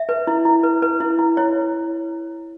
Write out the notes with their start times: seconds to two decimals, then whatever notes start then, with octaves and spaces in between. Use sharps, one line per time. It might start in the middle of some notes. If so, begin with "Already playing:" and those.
Already playing: E5
0.09 B4
0.27 E4
0.45 E4
0.63 B4
0.82 B4
1.00 E4
1.19 E4
1.37 E4 C#5